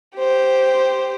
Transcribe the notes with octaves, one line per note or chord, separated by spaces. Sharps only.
G4 C5